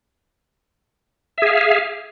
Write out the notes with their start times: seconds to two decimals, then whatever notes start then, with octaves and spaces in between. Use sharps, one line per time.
1.38 E5
1.42 G#4
1.46 F5